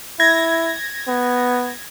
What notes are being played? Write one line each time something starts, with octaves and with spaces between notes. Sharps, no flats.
E4 G#6 A#6
B3